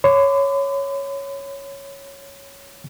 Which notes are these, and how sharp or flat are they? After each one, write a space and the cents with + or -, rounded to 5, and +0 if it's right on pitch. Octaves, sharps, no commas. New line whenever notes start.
C#5 +0 B5 +45 D6 +0